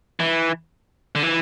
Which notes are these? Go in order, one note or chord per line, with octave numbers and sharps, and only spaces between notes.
E3
D3
E3